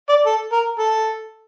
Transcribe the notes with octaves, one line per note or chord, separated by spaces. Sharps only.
D5
A4
A#4
A4